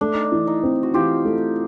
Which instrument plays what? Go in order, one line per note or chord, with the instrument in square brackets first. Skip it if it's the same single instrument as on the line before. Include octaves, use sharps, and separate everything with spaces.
[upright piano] A3 [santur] D4
[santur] D#4
D4
[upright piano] E3
[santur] D#4
[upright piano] C4
[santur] F#4
[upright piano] E3 [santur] F4 G4
[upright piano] A3